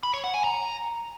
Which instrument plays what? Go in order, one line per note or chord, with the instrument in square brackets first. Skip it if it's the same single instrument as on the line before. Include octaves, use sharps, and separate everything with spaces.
[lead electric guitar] B5
C#5
F#5
G#5
A#5